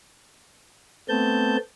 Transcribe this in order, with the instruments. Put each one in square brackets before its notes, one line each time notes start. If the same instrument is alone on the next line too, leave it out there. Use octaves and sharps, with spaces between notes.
[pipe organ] A3 B3 C4 A5 G6